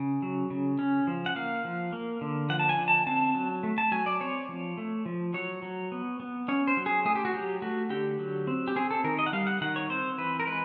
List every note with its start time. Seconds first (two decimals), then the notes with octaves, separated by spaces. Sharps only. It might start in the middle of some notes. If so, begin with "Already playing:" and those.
Already playing: C#3
0.22 F#3
0.50 C#3
0.79 C#4
1.07 F3
1.26 F#5
1.36 A#3 F5
1.65 F3
1.93 A#3
2.21 D3
2.49 F3 F#5
2.59 A5
2.69 G#5
2.78 D3
2.88 A5
3.07 C4 A5
3.35 F#3
3.63 A3
3.78 A5
3.92 F#3 G#5
4.06 D5
4.20 C4 C#5
4.49 F3
4.78 A3
5.06 F3
5.34 F#3 C#5
5.62 F#3
5.92 B3
6.20 B3
6.48 C#4 C#5
6.67 C5
6.77 F#3
6.86 G#4
7.05 A3 G#4
7.15 G4
7.25 F#4
7.34 F#3 G4
7.62 A3 F#4
7.90 D3 G4
8.19 F#3
8.47 C4
8.68 G4
8.76 C4 G#4
8.91 A4
9.04 D#3 A#4
9.19 D#5
9.26 F#5
9.33 G3 F5
9.47 F#5
9.61 D#3 F#5
9.76 C#5
9.90 C4 C5
10.18 E3 B4
10.40 A#4
10.47 G#3 B4